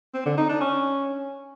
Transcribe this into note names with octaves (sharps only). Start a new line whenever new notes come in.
C4
D3
D#4
D4
C#4